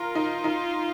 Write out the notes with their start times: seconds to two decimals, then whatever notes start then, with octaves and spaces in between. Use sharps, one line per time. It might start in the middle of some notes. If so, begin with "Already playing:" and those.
Already playing: F4 A#4
0.15 D#4
0.44 D#4